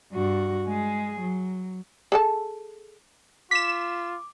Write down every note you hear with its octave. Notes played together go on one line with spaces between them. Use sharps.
G2 F#4
G#3 G#4
F#3
G#4 A4 A5
F4 D6 B6 E7